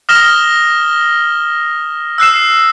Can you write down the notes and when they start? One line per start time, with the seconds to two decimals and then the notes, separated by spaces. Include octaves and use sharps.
0.09 D#6 F6 A#6 E7 G7
2.18 E6 F#6 C7 E7